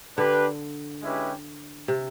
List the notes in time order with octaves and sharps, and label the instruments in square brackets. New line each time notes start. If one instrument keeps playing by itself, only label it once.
[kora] D3 [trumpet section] D4 G4 B4
[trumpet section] G#3 C#4 E4 G4 B4
[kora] C3